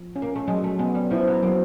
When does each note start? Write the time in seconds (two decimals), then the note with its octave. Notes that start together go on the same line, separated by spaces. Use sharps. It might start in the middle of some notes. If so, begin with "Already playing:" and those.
Already playing: F3
0.16 C#4
0.22 A#3
0.35 A3
0.48 F#3 G#3
0.64 A3
0.79 G#3 B3
0.95 G3
1.11 F3 E4
1.27 F#3
1.43 F#3 A#3